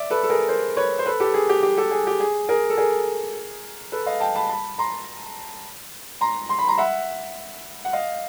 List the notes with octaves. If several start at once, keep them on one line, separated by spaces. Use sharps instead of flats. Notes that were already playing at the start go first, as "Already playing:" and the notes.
Already playing: D5 E5
A4 B4
A4
G#4 A#4
A#4 C5
B4 C#5
C5
A4 B4
G4 A4
G#4
G4
G4
G4 A4
G#4
G4
G#4
G#4 A#4
A4
G#4 A#4
A4 B4
D#5 F5
G5 A5
A5 B5
A5 B5
A#5 C6
A#5 C6
C6
B5
A#5 C6
E5 F#5
F#5
D#5 F5